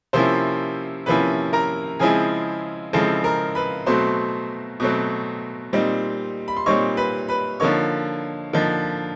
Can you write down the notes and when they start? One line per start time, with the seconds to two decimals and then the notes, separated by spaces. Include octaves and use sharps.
0.13 C3 F3 A#3 C#4 E4 C5 C6
1.06 C3 F3 A#3 C#4 E4 B4 B5
1.53 A#4 A#5
1.99 C#3 F3 G#3 C4 E4 G#4 G#5
2.93 C#3 F3 G#3 C4 E4 A4 A5
3.24 A#4 A#5
3.55 B4 B5
3.86 B2 F#3 A3 C4 C5 C6
4.80 B2 F#3 A3 C4
5.73 A#2 G3 C4 D#4
6.48 B5
6.57 C6
6.66 A#2 G3 C4 D#4 C#5 C#6
6.97 B4 B5
7.28 B4 B5
7.60 D3 F3 A#3 D#4 C#5 C#6
8.53 D3 F3 A#3 D#4